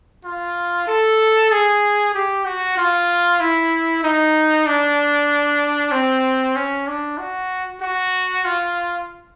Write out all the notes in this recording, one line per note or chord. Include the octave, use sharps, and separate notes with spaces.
F4
A4
G#4
G4
F#4
F4
E4
D#4
D4
C4
C#4
D4
F#4
F#4
F4